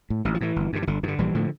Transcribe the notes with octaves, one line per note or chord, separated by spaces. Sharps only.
A2
A1 E3
F3
A2 E3
G1
G2 D3
E3
G1 D3
G2 D3 E3
A#1 E3 G3
A2 D3 F3